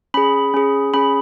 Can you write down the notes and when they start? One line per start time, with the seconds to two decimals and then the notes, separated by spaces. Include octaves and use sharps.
0.14 C#4 G#4 B5
0.54 C#4 G#4
0.94 C#4 G#4 B5